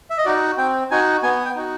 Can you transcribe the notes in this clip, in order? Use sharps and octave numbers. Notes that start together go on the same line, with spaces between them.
E5
D#5
D#4 F#4 D5
C4 G5
D#4 F#4 G#5
B3 G#5
G5
D#4 F#4